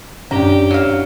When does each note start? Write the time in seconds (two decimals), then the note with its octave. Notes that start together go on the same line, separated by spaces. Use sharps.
0.31 F#2 C#4 D4 G4 A#5
0.71 F#3 F5